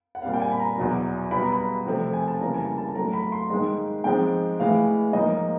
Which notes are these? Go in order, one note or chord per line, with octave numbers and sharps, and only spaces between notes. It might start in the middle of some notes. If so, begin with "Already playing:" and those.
F#5
A#2 G3 C4 F5
G5
G#5
B5
A#5
E2 B2 F#3
B2 G3 B3 B5
A#5
B5
C3 F3 A3 C4
G#5
A5
C#3 E3 G3 A#3 A#5
G#5
A5
A5
A5
A2 F#3 A3 A#5
B5
C6
G#2 D#3 G#3 C6
G#2 F3 G#3 C4 G5
A2 E3 G#3 F5
G#2 F3 A#3 D#5